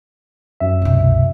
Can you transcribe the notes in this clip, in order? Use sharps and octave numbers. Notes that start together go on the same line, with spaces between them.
F#2 E5
C2 B2